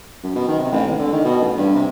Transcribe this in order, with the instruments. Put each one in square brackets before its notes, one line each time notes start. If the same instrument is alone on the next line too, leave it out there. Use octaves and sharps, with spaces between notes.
[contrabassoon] F#2
B2
D#3
C3
A1
G#1
D3
D#3
B2
A1
G2
C3